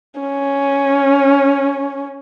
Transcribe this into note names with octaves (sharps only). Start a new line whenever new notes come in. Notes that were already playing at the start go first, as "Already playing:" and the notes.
C#4